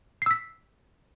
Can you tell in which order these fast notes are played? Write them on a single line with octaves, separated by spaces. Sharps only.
C7 E6 B6